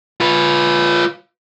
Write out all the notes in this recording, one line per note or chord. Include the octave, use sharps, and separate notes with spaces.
F4 B4